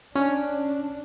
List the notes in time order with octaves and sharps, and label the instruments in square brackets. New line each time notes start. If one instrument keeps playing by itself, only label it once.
[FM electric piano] C#4 [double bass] D4